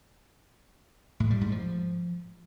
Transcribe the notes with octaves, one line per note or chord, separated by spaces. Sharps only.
A2
G3
G#2
F3